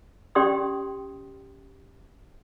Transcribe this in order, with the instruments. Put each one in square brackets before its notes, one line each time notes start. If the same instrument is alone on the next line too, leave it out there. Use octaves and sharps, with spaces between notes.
[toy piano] C#4 G4 D5 G5 C6 D#6